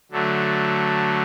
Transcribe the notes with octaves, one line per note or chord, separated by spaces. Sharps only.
D3 F#3 A3